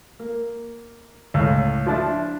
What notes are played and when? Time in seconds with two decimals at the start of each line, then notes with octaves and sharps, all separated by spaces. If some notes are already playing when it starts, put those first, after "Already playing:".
0.19 A#3
1.34 C#2 A2
1.86 F3 D4 E4